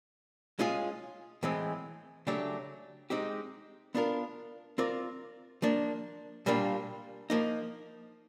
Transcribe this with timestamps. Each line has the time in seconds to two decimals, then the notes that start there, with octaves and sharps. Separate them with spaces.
0.59 G#3 C#4 F4 G#4
1.43 A2 E3 G#3 C4
2.27 C#3 F#3 A3 D4 G4
3.10 G#3 C4 D#4 G4
3.95 B3 D4 F4 A#4
4.78 C4 F4 A#4 D5
5.62 F3 A#3 D4
6.46 A#2 G3 A#3 D4 F4
7.30 F3 A#3 D#4